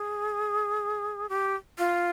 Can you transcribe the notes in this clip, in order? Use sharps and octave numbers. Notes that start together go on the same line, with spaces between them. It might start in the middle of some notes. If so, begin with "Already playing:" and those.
Already playing: G#4
G4
F4